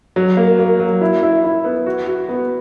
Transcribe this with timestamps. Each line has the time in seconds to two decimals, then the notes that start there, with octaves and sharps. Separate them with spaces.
0.16 F#3
0.37 A#3
0.59 A#3
0.80 F#3
1.01 E4
1.22 E4
1.44 E4
1.64 B3
1.86 F#4
2.07 F#4
2.29 B3